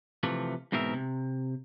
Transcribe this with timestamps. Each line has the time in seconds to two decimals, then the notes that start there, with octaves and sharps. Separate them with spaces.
0.23 C3 E3 F3 A3
0.72 E2 G#2 B2 C4 A#4 E5
0.94 C3